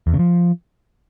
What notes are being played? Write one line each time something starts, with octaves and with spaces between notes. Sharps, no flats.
E2
C#3
F3